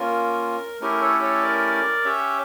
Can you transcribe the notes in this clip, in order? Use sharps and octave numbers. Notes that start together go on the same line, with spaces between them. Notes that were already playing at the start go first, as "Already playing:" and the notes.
Already playing: A#3 C#4 F4 A#4
A3 C#4 E4 G4 A#4
A4 C#5
A4 C#5
A#4 D5
C#4 G4 C#5 E5